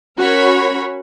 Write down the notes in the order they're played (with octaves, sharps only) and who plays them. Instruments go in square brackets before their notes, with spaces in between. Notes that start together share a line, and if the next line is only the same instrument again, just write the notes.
[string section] C#4 F#4 A#4 C#5 B5